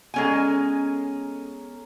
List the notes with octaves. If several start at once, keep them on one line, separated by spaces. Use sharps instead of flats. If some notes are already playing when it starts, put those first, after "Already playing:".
G#3 B3 C#4 A4 G#5 A#5